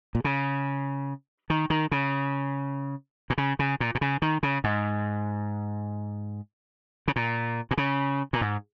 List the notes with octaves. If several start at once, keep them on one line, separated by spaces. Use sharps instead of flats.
A#2
C#3
D#3
D#3
C#3
A#2
C#3
C#3
A#2
A#2
C#3
D#3
C#3
G#2
C#3
A#2
A#2
C#3
A#2
G#2